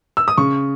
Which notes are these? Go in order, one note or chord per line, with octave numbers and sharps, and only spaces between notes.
E6
D#6
C#3 C#6